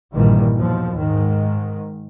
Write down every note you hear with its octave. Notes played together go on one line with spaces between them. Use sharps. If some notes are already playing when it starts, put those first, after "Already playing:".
A#1 G2 A#2 D#3 E3 G3
D#2 B2 F3
G#2 D#3